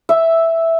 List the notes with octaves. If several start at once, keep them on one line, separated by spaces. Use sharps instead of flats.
E5